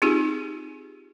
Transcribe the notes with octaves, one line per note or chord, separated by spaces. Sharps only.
C4 D#4 F4 G4 G#4